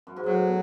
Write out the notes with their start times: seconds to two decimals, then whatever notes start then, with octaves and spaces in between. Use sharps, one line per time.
0.07 F#2
0.16 G#2
0.26 A2 F#3
0.47 B2